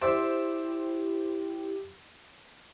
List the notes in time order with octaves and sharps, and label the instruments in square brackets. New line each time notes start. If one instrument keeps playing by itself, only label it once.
[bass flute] E4 [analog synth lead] G4 [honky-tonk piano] C5 [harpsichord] D5 E5 C6